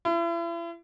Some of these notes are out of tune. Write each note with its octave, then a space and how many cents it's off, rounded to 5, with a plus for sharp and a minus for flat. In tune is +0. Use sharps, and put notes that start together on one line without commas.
E4 +40